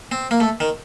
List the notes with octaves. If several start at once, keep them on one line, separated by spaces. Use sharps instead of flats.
C4
A#3
A3
D#3